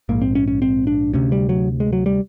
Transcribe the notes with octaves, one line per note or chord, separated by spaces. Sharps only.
A#1 G#2 A#3
C4
C#4
C#4
C4
D4
D2 C3 C#4
G3
F#3
G#3
F#3
G3